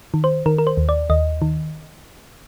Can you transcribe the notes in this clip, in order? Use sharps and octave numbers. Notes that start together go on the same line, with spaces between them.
D#3
C5
D#3 A#4
A#4
C5
D#2
D5
D#2 D#5
D#3